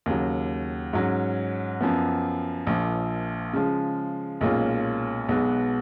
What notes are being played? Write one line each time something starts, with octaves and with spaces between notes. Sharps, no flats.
D#2 C#3 F#3
G#2 F#3 C#4
F#2 F3 B3
A#1 A#2 F3
C#3 F3 G#3
B1 A#2 G#3 C#4 F4
B1 B2 G#3 B3